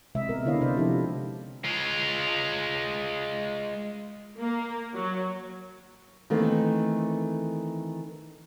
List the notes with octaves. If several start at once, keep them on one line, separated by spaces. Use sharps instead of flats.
C3 G#3 D#5 E5
G#3 B3 A#4
D3 D4 E4 C#5 D#5 F5
C3 C5 D5
F3 D#4 E4 G4 A4
G#3 F4
A#3
F#3
D#3 E3 A3 A#3 C4